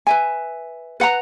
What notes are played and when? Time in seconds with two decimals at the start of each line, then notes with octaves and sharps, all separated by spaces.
0.07 B4 E5 G#5
1.00 B4 F#5 A#5